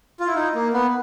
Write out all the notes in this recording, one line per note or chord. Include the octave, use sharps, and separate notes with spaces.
F4
E4
D#4
A#3
B3